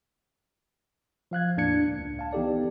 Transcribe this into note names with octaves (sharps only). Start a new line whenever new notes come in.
F3 F5 F#6 G#6
E2 A2 A#3 D4 G#6 C#7
C#2
F5 A5
E3 B3 D#4 G4 A4 D5